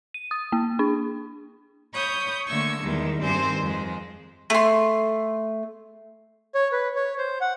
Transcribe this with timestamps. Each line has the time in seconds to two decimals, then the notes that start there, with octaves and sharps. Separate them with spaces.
0.14 D#7
0.31 D#6
0.52 A#3
0.79 D4
1.93 C#5 B5 C#6 D#6 G6
2.46 D3 A3 A#3 C#6 E6 G#6
2.80 E2 D#3 G3 G#3
3.22 G2 D#3 C4 C5 G#5
3.61 F2 G#3
4.50 A3 C6
6.55 C#5
6.72 B4
6.96 C#5
7.18 C5
7.41 F#5